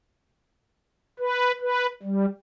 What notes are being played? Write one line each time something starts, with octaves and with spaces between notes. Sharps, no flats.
B4
B4
G3